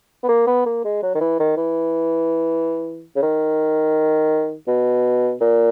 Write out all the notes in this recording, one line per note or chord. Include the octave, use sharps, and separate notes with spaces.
B3
A#3
B3
A#3
G#3
F#3
D#3
E3
D#3
E3
C#3
D#3
B2
A#2